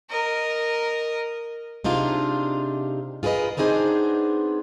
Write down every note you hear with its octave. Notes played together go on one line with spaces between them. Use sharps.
A#4 D#5
C3 D4 D#4 F4 G#4
F4 G#4 A#4 B4 D#5
B3 C4 D4 D#4 G#4 C5